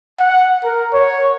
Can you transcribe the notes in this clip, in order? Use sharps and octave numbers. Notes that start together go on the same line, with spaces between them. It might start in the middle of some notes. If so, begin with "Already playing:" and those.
F#5
A#4
C#5